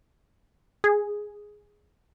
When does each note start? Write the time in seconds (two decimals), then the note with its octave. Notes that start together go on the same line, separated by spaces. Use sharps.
0.84 G#4